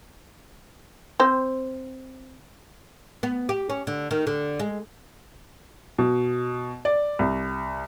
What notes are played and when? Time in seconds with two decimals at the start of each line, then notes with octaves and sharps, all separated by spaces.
1.20 C4 C5
3.23 B3
3.49 G4
3.70 C#4
3.87 D3
4.11 D#3
4.27 D3
4.59 G#3
5.99 B2
6.85 D5
7.19 C2